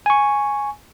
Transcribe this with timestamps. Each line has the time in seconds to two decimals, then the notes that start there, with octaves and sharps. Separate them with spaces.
0.06 G#5 C#6